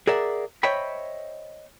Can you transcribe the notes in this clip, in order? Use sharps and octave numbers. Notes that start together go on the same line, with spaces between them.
G#4 A#4 D5 E5 F#5
C5 C#5 D#5 E5 G5 B5